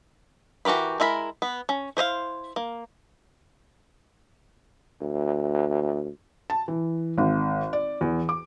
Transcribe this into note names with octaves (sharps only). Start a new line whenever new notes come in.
E3 F#4 G4 A#4 B5
G#3 E4 A#4 B5
B3
C#4
E4 C5 D#5 F5
A#3
D2
A5
E3
G#1
D5
E2
D6